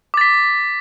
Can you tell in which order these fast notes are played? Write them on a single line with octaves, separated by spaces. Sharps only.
D6 A6 B6